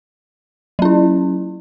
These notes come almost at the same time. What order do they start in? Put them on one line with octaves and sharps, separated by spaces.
F#3 C#4 E4